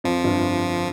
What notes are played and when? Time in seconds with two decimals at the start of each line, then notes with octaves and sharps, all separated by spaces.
0.04 F2 F3
0.24 G1 G2